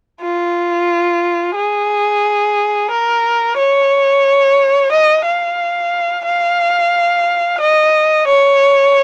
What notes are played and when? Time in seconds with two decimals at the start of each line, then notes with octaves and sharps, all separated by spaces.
0.21 F4
1.55 G#4
2.90 A#4
3.57 C#5
4.91 D#5
5.25 F5
6.25 F5
7.60 D#5
8.27 C#5